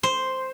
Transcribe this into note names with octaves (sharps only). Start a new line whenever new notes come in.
C5